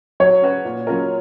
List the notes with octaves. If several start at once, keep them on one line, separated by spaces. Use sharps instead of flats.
F#3 C#5
C#4 F#4 B4
A#2
F#3 C#4 F4 A#4